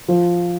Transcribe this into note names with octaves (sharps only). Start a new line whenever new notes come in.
F3